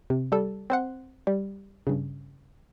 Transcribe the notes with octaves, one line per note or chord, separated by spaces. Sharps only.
C3
G3 A4
C4 C5 F#5
G3
G2 C#3